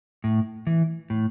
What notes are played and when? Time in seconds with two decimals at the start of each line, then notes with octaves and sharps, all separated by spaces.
0.24 A2
0.67 E3
1.10 A2